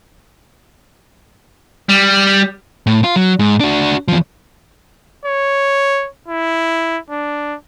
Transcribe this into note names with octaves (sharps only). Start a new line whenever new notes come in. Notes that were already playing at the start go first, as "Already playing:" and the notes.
G3
A2
F4
F#3
G#2
D4 F#4
E2 F3
C#5
E4
D4